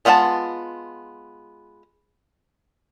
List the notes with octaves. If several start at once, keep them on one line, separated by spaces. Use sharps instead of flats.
G#3 B3 F4 F#5 A5